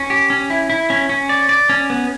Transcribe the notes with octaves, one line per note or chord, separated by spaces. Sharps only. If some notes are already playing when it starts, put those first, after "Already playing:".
Already playing: C#4
G4
C#4
E4
E4
C#4
C#4
D5
D5
C#4
B3